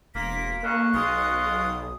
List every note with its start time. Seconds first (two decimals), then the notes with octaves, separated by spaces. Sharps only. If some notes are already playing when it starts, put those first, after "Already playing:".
0.15 E1 A#3 C6 B6
0.63 D2 C#3 A#3 D#5 C#6 F#6
0.94 B1 C#3 G#3 F4 D#6